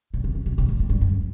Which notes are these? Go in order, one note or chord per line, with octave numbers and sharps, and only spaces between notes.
A#2
C3
C3
B2
B2
A#2
A2
G2
F#2